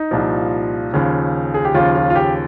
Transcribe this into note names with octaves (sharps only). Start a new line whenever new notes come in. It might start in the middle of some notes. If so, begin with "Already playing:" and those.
Already playing: D#4
C2 A#2 F3
D#2 C#3 F3
G#4
G4
D#2 C#3 F3 F4
F4
F4
G4